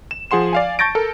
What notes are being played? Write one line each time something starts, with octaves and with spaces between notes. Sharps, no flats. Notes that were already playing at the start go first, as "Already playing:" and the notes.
E7
F3 G#4 F#5 C6 E7
D5 F5 G#5
A5 C#6 G6 A6 A#6 D7
A4 A#4